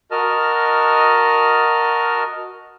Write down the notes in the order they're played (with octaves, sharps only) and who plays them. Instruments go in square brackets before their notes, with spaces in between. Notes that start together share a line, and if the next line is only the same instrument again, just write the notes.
[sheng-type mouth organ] F#4 A#4 D#5 A5 F6